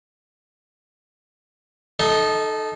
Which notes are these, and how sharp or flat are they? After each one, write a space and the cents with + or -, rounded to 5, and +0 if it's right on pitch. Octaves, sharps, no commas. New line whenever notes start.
D#4 -20 A4 -15 D#5 +25